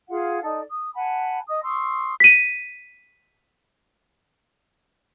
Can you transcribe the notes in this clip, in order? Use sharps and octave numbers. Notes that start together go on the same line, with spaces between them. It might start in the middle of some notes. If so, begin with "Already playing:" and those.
F4 G#4 F5 F#5
D#4 A4 D5
D#6
F#5 G#5 A5 B5
D#5 D#6
C6 C#6 D#6 E6
B6 D#7